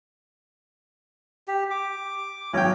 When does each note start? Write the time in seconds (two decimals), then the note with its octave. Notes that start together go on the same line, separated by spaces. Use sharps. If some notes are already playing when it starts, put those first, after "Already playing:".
1.48 G4
1.71 D6
2.53 G#1 F#3 C#5 G5